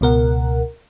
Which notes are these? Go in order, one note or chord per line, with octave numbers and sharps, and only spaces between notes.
C#2 B2 A#4 F#5